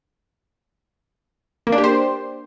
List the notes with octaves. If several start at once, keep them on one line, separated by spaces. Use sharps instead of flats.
A#3
D4
G4
C5